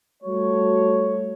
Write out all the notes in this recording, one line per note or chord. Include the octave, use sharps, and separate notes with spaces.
G3 A3 F#4 A4 C#5